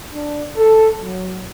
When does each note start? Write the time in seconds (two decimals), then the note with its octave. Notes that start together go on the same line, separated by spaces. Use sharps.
0.14 D4
0.57 A4
1.01 F#3